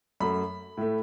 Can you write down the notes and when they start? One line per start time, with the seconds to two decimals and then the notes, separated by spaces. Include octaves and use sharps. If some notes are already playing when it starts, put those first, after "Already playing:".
0.20 F#2 F#3 A3 B5
0.77 A2 A3